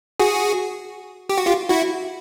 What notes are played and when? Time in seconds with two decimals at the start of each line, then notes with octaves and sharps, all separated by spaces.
0.20 F#4 G#4
1.29 G4
1.38 F#4
1.46 F4 G4
1.69 E4 F#4